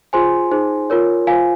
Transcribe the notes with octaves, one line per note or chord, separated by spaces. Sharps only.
F4 G#4 C5 G#5 C6
D#4 G#4 C5
F4 A#4 C#5
F4 C5 F5 G#5